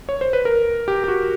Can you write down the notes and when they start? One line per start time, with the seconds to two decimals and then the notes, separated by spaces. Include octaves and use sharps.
0.09 C#5
0.21 C5
0.33 B4
0.45 A#4
0.88 G4
1.04 G4
1.08 F#4